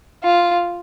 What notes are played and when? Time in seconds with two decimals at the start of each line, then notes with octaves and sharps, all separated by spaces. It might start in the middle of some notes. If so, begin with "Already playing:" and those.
0.24 F4